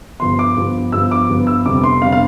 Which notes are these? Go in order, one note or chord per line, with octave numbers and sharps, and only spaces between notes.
G2 F3 B3 C6
D6
G2 F3 B3
G2 F3 B3 E6
D6
G2 F3 B3
E6
F2 C3 G3 B3 D4 D6
C6
F2 C3 G3 B3 D4 F5
F5